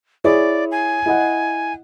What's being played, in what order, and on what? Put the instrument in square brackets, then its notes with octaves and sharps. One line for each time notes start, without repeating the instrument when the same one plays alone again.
[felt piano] E4 G#4 C#5 [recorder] D5
[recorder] G#5
[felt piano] E4 D#5 F#5